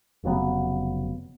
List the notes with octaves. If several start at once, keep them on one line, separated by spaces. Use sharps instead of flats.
F1 C#3 F#3 B3